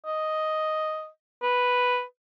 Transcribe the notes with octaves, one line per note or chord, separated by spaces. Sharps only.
D#5
B4